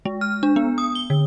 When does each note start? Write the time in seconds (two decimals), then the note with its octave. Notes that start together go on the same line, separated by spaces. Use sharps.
0.05 G#3
0.21 F6
0.43 D4
0.56 B3
0.78 D#6
0.95 G7
1.10 D3